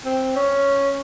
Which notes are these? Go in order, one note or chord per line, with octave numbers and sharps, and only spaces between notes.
C4
C#4